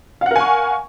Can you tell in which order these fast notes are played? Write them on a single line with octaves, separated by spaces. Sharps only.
F5 F#5 A#4 G#5 C#6